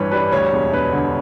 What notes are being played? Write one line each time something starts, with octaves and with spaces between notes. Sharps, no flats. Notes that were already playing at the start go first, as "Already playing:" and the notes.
Already playing: A1 G2 E3 B4 C#5
G3 B4
D2 C#5
E1
E1 B4
D3